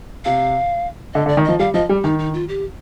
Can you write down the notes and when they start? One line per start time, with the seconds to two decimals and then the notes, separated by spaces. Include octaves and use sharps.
0.25 C3 F5
1.14 D3 D#5
1.26 D3
1.29 D5
1.37 D#3
1.45 F3 D#5
1.59 G3 F5
1.74 F3 D#5
1.89 G3
2.04 D#3 D#4
2.19 D#4
2.34 F4
2.49 G4